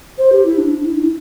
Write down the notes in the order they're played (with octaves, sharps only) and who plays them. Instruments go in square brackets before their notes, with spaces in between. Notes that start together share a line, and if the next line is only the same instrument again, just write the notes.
[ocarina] C5
G4
E4
D4
D4
E4
D4
E4